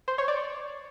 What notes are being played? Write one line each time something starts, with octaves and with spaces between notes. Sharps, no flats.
C5
C#5
D5